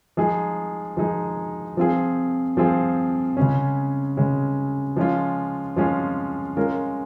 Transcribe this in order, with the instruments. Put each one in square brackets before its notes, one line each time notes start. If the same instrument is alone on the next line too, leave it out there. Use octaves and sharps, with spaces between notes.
[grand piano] F3 G#3 D#4 G#4
F3 G#3 D#4 G#4
F3 C4 F4 G#4
F3 C4 F4 G#4
C#3 G#3 C#4
C#3 G#3 C#4
F3 G#3 C#4 F4
F3 G#3 C#4 F4
G#3 C#4 F4 A#4